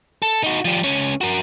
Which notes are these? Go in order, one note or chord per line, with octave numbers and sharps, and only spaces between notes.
A4
D#4 F#4
F3 G3
C#2 C#4
F#4 A#4